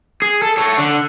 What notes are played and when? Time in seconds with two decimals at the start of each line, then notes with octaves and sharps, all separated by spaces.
0.22 G#4
0.42 A4
0.57 A4 C#5
0.78 D3